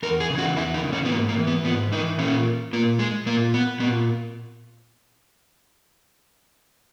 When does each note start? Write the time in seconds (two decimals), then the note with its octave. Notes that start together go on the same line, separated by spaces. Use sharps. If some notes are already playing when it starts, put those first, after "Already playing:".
0.03 E2 A#4
0.20 G#4
0.30 C#3
0.35 E3 F#4
0.57 E2 E4
0.74 D#4
0.83 C#3 E3
0.93 C#4
1.05 B3
1.10 G#2 A#3
1.29 A#3
1.37 E3
1.47 B3
1.64 G#2 B3
1.92 E3 D#4
2.18 A#2 C#4
2.73 A#2 A#3
2.99 G#3
3.26 A#2 A#3
3.54 B3
3.80 A#2 B3